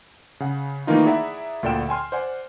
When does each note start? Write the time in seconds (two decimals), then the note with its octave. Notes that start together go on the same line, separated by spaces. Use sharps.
0.40 C#3 F#5
0.87 D#3 E3 A3 A#3 D#4 F4
1.06 E4 G#4 D5 E5 F#5 A#5
1.63 D2 A#2 A4 D5 G5 E7
1.89 G5 G#5 C6 F6
2.12 C5 D5 F#5 G#5